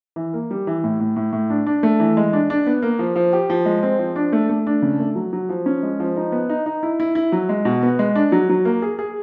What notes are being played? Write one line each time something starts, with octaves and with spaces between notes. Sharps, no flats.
E3
A#3
G3
E3
A2
A2
A2
A2
D4
D4
A3
E3
G#3
D4
D4
B3
A#3
F3
F3
G4
F3
G#3
C4
F3
D4
A3
A3
D4
C#3
A3
F#3
F#3
F3
C#4
G#3
F3
D#4
B3
D#4
D#4
E4
E4
E4
F#3
G#3
B2
B3
G#3
D4
F#3
F#3
A#3
G#4
G#4